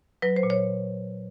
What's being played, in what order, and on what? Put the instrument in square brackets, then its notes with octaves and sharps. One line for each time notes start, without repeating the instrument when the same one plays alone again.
[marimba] F#3 B4
C5
A#2
C#5